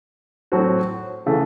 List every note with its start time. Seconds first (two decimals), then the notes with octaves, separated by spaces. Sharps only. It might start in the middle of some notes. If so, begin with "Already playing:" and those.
0.52 A2 F#3 C4 F#4
1.26 C#3 E3 A3